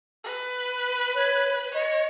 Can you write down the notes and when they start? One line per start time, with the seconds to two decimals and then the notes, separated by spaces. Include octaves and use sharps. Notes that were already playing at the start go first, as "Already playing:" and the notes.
0.24 B4
1.15 C#5
1.74 C#5 D#5